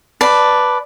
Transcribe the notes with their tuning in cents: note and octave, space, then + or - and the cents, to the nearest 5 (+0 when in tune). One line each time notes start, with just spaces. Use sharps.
B4 +0 D5 +0 A5 +5